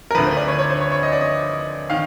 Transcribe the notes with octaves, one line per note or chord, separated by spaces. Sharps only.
A#4
D2 D3 F3 B4
C5
D5
C#5
C#5
C5
C#5
C#5
D#5
D5
D#5
D#3 F5